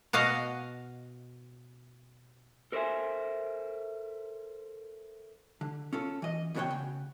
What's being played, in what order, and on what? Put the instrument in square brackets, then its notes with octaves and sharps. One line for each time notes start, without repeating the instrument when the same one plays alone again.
[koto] B2 F#4 D#5 F5
[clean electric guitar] A4 A#4 C5 C#5 E5 G#5
[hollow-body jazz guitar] D3
C#4 F4 A4
E3 D#5
E2 A2 C#3 F#4 C#5 G5
C#3